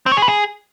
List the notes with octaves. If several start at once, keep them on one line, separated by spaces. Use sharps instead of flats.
C4
C#5
G#4
B4
G#4